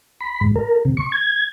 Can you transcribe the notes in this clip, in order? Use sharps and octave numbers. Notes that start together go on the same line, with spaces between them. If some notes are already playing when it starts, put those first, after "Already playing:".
B5
G#2
A#4
C3
C#6
G#6